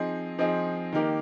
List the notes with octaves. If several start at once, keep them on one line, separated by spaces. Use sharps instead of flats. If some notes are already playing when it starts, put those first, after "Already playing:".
Already playing: F3 C4 D#4 G#4 D#5
F3 C4 D#4 G#4 D#5
D#3 A#3 D#4 G4 A#4